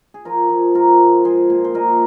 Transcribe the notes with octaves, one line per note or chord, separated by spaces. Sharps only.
G#4
F3 F4 A#4
F3
G#2 F4 A#4
G#2
F3 G#4 C5
A#2
C5
A#2 A#4 D#5